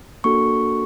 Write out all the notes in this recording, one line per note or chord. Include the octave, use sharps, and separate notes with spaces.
A#3 D4 F#4 A4 C#6